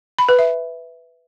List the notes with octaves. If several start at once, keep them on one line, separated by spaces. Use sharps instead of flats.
B5
B4
E5